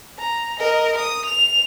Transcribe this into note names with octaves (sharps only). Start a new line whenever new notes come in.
A#5
A#4 D#5
D#6
F7